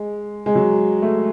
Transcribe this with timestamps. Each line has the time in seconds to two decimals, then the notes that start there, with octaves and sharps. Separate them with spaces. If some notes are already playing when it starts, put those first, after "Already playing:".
Already playing: G#3
0.46 G#3
0.55 F#3
1.02 A3